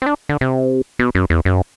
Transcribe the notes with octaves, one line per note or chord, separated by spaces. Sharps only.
C4
D4
D3
C3
B2
F#2
E2
F#2